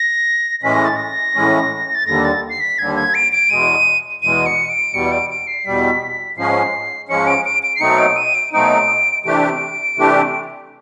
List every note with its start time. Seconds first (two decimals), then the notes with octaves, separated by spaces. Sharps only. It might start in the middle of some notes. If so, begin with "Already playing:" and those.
Already playing: A#6
0.63 A2 E3 G#3 C#4 B6
0.74 A#6
0.85 A6
0.96 A#6
1.34 A2 E3 G#3 C#4
1.95 A6
2.06 D#2 D3 G3 A#6
2.25 A6
2.50 C7
2.60 B6
2.78 D#2 D3 G3 G#6
2.96 G#6
3.15 D7
3.32 D7
3.50 E2 B2 G#3 D#7
4.22 E2 B2 G#3 D#7
4.46 C#7
4.70 D7
4.93 E2 B2 G3 C#7
5.12 D7
5.30 D7
5.47 C7
5.65 E2 B2 G3 B6
6.37 G#2 F3 G#3 C#4 C7
7.09 G#2 F3 G#3 C#4 C#7
7.27 D7
7.45 D7
7.63 D7
7.76 C7
7.81 B2 F#3 A3 C4 D#4 C#7
7.99 D7
8.17 D#7
8.35 D7
8.53 B2 F#3 A3 C4 D#4 D7
9.24 C3 E3 A3 D4 G4 D7
9.97 C3 E3 A3 D4 G4